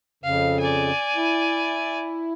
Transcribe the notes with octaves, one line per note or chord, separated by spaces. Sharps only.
F2 C#3 F5
D5 G#5
E4